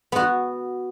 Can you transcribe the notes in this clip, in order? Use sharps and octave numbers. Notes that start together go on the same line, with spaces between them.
B3 F#4